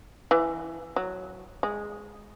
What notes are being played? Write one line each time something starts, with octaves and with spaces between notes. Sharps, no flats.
E3
F#3
G#3